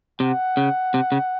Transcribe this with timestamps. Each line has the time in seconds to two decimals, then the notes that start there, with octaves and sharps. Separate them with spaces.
0.20 C3 F#5
0.57 C#3
0.94 C3
1.12 C#3